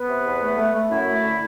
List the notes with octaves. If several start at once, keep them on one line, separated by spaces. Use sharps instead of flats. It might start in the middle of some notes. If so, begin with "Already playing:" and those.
Already playing: B3 B4
C3
E2
A3
A3
A3
F#2 E4
A3
D3